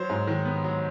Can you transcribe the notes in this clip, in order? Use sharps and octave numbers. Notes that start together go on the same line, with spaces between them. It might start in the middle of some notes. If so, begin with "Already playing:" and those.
Already playing: F#3 C5
G#2
D#3
B3
F#3